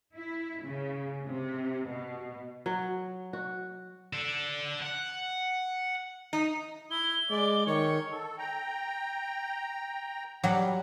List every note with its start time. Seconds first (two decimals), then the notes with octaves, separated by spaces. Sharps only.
0.15 E4
0.65 C#3
1.27 C3
1.87 B2
2.66 F#3
3.33 F#4
4.13 D4 A4
4.82 F#5
6.33 D#4
6.91 E4 G7
7.30 G#3 D5
7.67 D#3 C#5 C#6
8.11 A4
8.38 G5 A#5
10.44 F#3 G3 G4 F#5